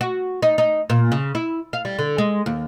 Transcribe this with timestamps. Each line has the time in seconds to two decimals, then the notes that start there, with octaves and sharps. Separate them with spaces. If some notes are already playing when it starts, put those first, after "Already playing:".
0.01 F#4
0.42 D#4
0.58 D#4
0.90 A#2
1.12 C#3
1.35 E4
1.73 F5
1.85 G3
1.99 D3
2.18 G#3
2.46 D#2